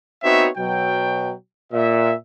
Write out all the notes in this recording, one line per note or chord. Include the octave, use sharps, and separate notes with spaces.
B3 C4 D#4 F#4 C#5 E5
B2 F#3 G5
A#2 E5